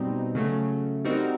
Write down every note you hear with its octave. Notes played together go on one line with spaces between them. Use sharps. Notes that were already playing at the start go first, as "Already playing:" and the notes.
Already playing: B2 G3 C4 D#4
C#3 F#3 A3
G3 C4 D#4 F#4 A#4